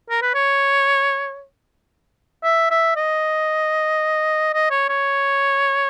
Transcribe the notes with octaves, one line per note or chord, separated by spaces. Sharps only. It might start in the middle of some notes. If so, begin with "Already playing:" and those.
A#4
B4
C#5
E5
E5
D#5
D#5
C#5
C#5